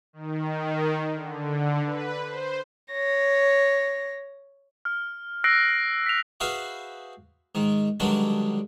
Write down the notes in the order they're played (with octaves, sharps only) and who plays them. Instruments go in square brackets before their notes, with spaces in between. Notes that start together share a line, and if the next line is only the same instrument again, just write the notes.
[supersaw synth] D#3
D3
B4
C5
[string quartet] C#5 A#6
[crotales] F6
E6 F#6 A#6 C7 D7
B6 F7
[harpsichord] F#4 G#4 B4 C5 E5 F5
G#2 D#3
G2 D3 D#3 F#3 G#3 D4